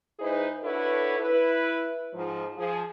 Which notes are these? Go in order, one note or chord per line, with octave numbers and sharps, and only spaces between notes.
G#2 D#4 E4 G#4 B4 C5
D4 E4 F#4 A4 B4 C#5
E4 B4
G#2 F3
F3 G#4